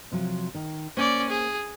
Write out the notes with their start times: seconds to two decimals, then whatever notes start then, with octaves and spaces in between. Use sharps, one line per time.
0.12 C3 F3 F#3
0.55 D#3
0.97 A#3 C#4 C5 D5
1.30 G#4